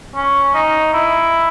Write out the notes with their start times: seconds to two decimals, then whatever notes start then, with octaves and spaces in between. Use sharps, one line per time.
0.15 C#4
0.54 D#4
0.93 E4